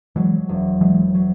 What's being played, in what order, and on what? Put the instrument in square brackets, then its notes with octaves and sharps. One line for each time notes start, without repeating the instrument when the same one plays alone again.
[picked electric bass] E3 G#3 [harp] F#3
[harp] E1
[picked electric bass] E3 G#3 [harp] F#3
[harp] F#3